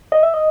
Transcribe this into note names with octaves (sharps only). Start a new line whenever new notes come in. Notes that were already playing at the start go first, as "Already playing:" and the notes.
D#5
E5
D#5